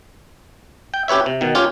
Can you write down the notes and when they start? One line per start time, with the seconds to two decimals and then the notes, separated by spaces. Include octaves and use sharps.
0.94 G5
1.08 C#4 G4 B4 C#5 E5
1.26 C3
1.41 B2 D#3
1.55 C#4 F4 G4 C#5